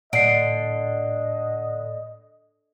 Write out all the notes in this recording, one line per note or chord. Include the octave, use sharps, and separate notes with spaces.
A2 D3 D#5 C7 D7